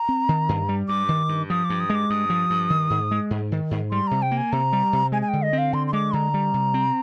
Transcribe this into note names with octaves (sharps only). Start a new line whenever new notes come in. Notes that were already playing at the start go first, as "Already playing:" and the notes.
Already playing: A#5
C4
D#3
G2
G3
G2 D6
D#3
G2
F3 D#6
D6
G2
D#6
G#3
D6
G2 D#6
F3
G2
D#3
G#2
G#3
G#2
D#3
G#2
G3 C6
C3 A#5
G5
A#3
G#5
C3 A#5
G3
C3
G#3 G#5
G#5
D3 G5
D#5
C4
F5
D3 C6
C6
G#3 D6
D3 A#5
G3
C3
C4